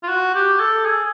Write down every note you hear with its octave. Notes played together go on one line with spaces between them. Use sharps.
F4
F#4
G4
A4
G#4